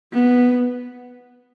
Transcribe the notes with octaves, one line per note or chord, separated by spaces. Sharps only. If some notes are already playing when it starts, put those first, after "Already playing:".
B3